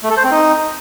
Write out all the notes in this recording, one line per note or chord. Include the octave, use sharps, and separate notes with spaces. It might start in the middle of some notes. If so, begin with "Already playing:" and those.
A3
A4
C5
C4
D#4